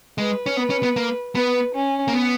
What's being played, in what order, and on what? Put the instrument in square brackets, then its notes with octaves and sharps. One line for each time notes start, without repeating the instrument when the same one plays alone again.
[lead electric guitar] G#3 [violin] B4
[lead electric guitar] C#4
[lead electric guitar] B3 [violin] B4
[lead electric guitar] C#4
B3
A#3
[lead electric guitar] B3 [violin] B4
[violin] C#4
[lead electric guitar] A#3
B3